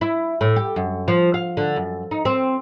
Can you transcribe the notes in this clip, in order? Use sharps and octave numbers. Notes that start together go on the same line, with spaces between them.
E4
A2
G4
F#2
F3
F5
D3
F#2
D#4
C4